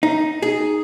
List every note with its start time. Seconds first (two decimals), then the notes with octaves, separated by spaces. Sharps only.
0.03 D#4
0.42 G#4